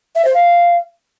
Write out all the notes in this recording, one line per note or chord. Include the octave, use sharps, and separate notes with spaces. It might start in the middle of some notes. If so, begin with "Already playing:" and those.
E5
C5
F5